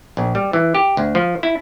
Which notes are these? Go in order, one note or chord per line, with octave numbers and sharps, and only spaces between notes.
A#1
G3
E3
G4
D2
F3
E4